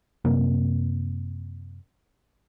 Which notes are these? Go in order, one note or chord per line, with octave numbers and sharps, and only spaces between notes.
F#2 C3 A#3